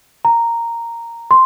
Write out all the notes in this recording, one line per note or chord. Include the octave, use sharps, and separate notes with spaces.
A#5
C6